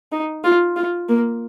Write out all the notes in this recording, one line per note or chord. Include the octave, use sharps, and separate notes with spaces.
D#4
F4
F4
A#3